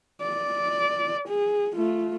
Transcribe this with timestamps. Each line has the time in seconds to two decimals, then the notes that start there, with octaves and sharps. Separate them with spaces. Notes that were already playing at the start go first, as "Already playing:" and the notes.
0.22 D5
1.28 G#4
1.75 A3 F4